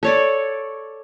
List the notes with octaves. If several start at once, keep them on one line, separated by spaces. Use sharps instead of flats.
A4 C#5 D5